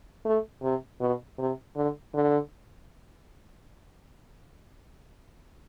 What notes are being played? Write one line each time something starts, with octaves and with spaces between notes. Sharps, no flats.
A3
C3
B2
C3
D3
D3